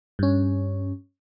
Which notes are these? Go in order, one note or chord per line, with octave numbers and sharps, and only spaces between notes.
G2 C#4